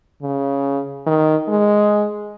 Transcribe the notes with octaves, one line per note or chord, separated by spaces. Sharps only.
C#3
D#3
G#3